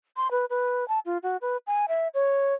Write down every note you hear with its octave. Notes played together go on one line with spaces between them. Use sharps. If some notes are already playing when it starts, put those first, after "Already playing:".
C6
B4
B4
A5
F4
F#4
B4
G#5
E5
C#5